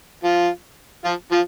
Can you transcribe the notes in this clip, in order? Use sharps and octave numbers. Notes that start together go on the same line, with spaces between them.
F3 F4
F3 F4
F3 F4